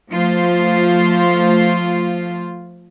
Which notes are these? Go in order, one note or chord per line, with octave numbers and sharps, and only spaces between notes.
F3 A3 F4 C5